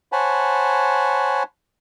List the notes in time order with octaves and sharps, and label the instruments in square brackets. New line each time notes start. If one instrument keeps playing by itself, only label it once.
[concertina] C5 C#5 F#5 G#5 A5 B5